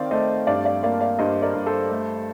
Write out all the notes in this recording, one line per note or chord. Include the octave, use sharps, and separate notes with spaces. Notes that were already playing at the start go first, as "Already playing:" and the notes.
Already playing: D#3 C4 D5 F5
A3 C5 D#5
G2 D5 F5
D5 F5
A#3 D5 F5
D5 F5
G2 C5 D#5
A#4 D5
G2
A4 C5
A3